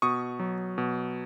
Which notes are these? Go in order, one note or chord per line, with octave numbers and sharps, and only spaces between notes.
B2 C#6 D#6
F#3
B2